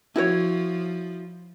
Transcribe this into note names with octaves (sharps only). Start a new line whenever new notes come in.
F3 E4 F#4 C#5